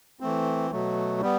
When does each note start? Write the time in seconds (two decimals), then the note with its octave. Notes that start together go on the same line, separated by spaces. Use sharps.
0.20 E3 A3 C4
0.71 B2 F#3 A3
1.21 G3 B3